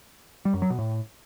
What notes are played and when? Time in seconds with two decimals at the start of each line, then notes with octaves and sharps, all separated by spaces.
0.45 G3
0.54 F#2
0.62 F#3
0.70 B2
0.78 A2